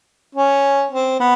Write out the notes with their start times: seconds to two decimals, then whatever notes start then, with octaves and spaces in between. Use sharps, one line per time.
0.35 C#4
0.92 C4
1.20 B3